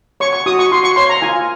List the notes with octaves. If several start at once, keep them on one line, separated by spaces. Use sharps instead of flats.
C#5 C#6
C#6
F#4 D#6
C#6
F#4 C6
C#6
C#5 C6
A#5
F4 G#5